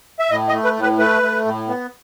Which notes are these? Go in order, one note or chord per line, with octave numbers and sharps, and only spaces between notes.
E5
A2 D#5
D#5
A3
B4
A2
B4
A3 B4
A3
A2
B3